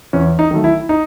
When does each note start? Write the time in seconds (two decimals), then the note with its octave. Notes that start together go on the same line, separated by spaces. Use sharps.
0.13 E2 C#4
0.39 D#4
0.51 D#3 F#3 A3
0.64 E4
0.89 D#4